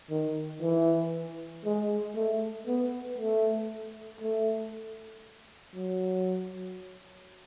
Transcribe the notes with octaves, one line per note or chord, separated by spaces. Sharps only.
D#3
E3
G#3
A3
B3
A3
A3
F#3